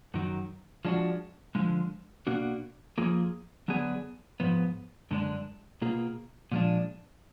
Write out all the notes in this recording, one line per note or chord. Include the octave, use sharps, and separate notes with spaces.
F#2 D#3 F#3
F3 G#3 D4 F#4
D3 F3 G#3
B2 A#3 D4 F#4
F2 F3 A#3 F4 G#4
D3 F#3 B3 D4 G#4
G#2 F3 B3
F#2 D3 G#3 D4
B2 A#3 F4 G#4
A#2 F3 G#3 D4